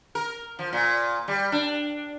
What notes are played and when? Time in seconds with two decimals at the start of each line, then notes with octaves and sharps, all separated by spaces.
0.15 A#4
0.59 F3
0.73 A#2
1.28 G3
1.52 D4